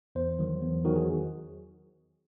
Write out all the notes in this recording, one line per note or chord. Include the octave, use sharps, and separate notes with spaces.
E2 C5
D#3 F#3
E2
D#3 F#3 F#4
G#4